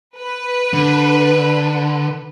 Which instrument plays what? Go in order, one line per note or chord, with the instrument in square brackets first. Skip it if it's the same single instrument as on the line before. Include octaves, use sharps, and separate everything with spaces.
[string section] B4
[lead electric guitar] D3